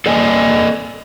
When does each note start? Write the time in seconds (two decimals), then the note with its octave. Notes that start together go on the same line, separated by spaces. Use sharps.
0.06 A4 D5 D#5 G#5